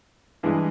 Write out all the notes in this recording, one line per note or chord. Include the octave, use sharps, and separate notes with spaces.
G2 E3 G#3